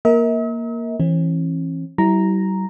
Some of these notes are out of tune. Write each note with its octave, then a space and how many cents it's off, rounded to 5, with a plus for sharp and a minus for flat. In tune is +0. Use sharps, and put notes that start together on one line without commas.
A#3 +5 A#4 +0 E5 -45
E3 +0 C#4 -45
G3 -40 E4 -10 A#5 +0